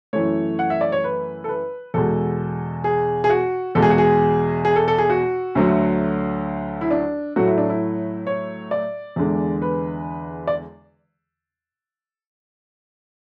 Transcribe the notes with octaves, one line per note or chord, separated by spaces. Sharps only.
F#2 E3 A3 C#5
F#5
E5
D5
C#5
B4
A4
B4
E2 B2 G#3 A4
G#4
G#4
F#4
E2 B2 G#3 A4
G#4
F#4
G#4
G#4
A4
A4
G#4
F#4
D2 D3 F#3 A3
E4
D4
A2 F#3 A3 F#4
E4
D4
E4
C#5
D5
E2 D3 G#3
B4
D5